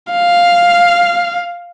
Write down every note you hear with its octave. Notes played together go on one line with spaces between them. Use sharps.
F5